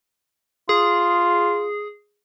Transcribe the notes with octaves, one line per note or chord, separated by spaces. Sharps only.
F4 G#4